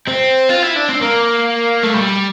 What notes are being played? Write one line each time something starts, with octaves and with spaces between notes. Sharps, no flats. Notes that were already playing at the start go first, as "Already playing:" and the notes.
C4
F4
E4
D4
C4
A#3
A3
G3